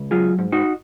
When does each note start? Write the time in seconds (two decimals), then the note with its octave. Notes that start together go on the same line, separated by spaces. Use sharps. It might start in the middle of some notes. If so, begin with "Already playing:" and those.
Already playing: C#2
0.11 F#3 F4 G#4
0.39 G#2
0.52 D#4 F#4